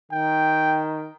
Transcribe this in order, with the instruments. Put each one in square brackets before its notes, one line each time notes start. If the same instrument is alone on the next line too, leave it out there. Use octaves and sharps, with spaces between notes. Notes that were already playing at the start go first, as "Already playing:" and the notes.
[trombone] D#3 [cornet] G5